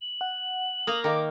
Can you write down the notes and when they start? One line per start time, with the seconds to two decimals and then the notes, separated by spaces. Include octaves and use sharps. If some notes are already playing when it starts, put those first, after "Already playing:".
0.01 F#7
0.21 F#5
0.87 A#3 A#5 D#6
1.04 D#3 A#3 A#4 D6